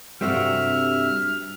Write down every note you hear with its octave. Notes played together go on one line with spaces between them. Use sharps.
G2 C3 G3 A3 C4 F#4 E5 F6